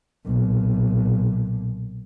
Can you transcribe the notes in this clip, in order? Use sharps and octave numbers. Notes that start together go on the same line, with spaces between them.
B1 A#2